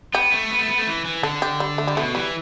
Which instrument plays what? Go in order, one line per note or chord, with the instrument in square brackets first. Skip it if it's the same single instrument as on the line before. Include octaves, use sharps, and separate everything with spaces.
[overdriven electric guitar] B3 [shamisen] G4
[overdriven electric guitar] A3
B3
A3
B3
A3
E3
E3
[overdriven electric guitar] D3 [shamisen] A4
[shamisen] G4
G3
A3
G3
[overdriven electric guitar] B2 [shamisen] A3
[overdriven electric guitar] E3 [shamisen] G3